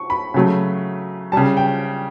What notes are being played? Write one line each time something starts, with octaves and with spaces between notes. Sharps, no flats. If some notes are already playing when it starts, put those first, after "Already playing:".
Already playing: C#6
B5
C#3 F#3 A3
C#3 G3 A5
G5